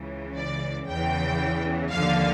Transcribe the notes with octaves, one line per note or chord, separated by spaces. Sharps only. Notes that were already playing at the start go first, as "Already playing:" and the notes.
Already playing: C#2 C#3 E3
D5
E2 C#3 E3 G5
D#2 D3 F3 F5